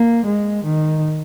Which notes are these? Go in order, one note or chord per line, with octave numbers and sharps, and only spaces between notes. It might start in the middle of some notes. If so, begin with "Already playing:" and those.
Already playing: A#3
G#3
D#3